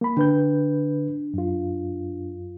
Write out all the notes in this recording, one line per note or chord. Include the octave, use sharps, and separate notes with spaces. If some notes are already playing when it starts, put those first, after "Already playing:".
A#3 B5
D3 D4 B4 G6
F#2 F4